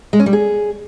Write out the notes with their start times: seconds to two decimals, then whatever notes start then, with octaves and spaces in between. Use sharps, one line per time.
0.13 G#3
0.20 C#4
0.26 G3
0.33 G#4